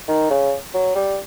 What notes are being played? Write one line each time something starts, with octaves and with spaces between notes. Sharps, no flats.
D#3
C#3
F#3
G3